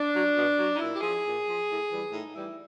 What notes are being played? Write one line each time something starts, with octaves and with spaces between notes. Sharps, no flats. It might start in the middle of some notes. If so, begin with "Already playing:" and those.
Already playing: D4
F#3
B2
F#3
D#4
A#2 E4
G4
F3 G#4
A#2
F3
A2
E3 G3
A2 D#4
E3 G3 E4